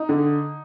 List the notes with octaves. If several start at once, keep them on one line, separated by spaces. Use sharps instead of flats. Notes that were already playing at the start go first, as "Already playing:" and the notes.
Already playing: D#4
D3